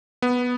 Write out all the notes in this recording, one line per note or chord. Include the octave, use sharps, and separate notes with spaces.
B3